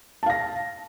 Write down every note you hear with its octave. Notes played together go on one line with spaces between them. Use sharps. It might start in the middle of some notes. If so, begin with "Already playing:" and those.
F5 A5 A#6